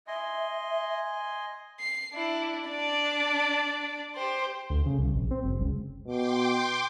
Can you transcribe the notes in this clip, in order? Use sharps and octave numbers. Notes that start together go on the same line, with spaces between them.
D#5 E5 G#5 C6
C7
D4 E4
D4 D5
G4 C5
D2
C#3
C2
A#1
C4
F#1
C#2
B2 G5 C6 D6